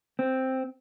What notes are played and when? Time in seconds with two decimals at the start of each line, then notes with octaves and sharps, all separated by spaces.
0.19 C4